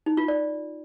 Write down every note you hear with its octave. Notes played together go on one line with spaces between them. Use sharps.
D#4
F4
D5